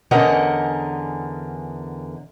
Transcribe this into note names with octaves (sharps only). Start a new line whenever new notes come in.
E2 D3 C#4 A#4 D#5 F#5